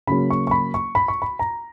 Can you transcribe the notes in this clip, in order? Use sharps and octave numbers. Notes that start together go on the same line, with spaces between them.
C#3 F#3 A#3 C#4 B5
C#6
C#6
B5
C#6
B5
C#6
B5
A#5